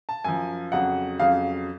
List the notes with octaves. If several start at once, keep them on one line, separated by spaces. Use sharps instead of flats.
A5
F#2 F3 G#5
F2 C#3 F#3 F#5
F2 C#3 F#3 F5